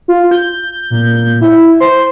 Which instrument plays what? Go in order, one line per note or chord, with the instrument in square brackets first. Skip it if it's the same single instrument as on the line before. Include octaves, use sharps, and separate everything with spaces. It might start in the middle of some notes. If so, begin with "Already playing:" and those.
[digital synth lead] F4
G6
[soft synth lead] A#2
A#2
E4
[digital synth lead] C5 [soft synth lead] C6